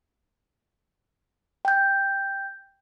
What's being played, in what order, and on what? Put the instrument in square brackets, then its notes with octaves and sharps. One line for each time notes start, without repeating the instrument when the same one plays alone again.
[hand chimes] G5 G6